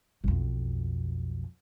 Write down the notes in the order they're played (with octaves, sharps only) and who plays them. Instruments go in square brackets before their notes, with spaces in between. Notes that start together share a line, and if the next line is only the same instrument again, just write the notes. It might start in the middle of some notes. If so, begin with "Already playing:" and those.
[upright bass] B1 F2